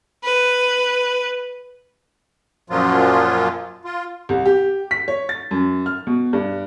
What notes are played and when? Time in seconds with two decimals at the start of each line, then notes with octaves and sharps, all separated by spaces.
0.24 B4
2.70 F#2 A#2 F3 F#3 F4
3.85 F4
4.29 C2
4.46 G4
4.91 B6
5.08 C#5
5.29 A6
5.51 F#2
5.86 F6
6.07 B2
6.33 G2